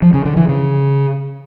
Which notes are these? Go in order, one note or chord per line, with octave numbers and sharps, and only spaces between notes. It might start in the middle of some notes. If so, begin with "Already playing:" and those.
F3
C#3
D3
E3
C#3